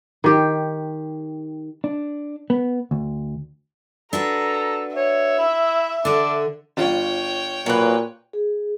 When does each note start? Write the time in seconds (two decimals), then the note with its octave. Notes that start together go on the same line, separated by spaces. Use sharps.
0.24 D#3 G4
1.84 D4
2.50 B3
2.91 D2
4.13 D4 F#4 A4 B4 A#5
4.96 C#5 E5
5.39 E4
6.05 D3 D4 F#5
6.77 G1 F4 C#5 G5
7.66 A#2 F#3 A#3 B4
8.33 G#4